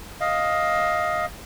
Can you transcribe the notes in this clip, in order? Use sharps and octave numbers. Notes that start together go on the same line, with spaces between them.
D#5 F5